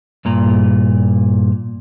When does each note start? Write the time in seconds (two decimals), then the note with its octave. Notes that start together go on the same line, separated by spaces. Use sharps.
0.25 G2 A#2 A#5